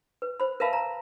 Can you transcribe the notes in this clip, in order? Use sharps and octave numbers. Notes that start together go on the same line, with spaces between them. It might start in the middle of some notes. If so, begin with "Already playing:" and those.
B4
C5 B5
A#4 B4 E5 F5 A5 B5
A#5